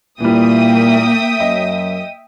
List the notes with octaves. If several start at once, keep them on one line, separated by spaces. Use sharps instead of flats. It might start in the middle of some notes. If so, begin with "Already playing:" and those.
A#2 E3 G3 A#3 E5 G5 D#6
F#2 D#5